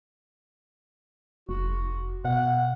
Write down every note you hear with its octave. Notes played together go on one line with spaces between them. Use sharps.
F1 F#4
B2 F#5